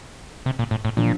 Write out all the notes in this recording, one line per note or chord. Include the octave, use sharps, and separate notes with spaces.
C3
A#2
A2
A2
A#2 D3 F3